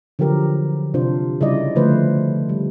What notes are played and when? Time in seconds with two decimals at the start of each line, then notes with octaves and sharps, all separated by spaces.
0.19 D3 F3 F#3 G4 A#4
0.94 C3 D4 F4 C5
1.41 C#3 G3 E4 D5 D#5
1.76 D3 F3 A3 B4 C5
2.49 G3